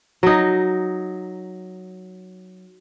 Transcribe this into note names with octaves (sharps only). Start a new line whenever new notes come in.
F#3 D#4